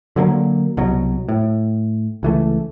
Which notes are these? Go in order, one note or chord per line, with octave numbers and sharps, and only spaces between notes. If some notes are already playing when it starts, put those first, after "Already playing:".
D3 F#3 G#3 A#3
C2 B2 F#3
A2
C#2 E3 A3